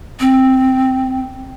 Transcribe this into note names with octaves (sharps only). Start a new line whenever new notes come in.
C4